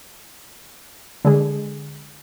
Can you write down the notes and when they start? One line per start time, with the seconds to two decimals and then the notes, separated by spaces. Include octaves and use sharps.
1.25 D3 G#3 G#4